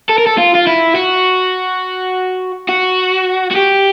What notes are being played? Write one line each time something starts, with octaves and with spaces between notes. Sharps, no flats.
A4
A#4
A4
F4
F4
E4
F#4
F#4
F#4
G4